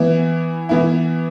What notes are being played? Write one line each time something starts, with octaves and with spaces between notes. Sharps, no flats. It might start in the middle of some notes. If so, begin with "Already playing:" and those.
Already playing: E3 B3 E4
E3 B3 E4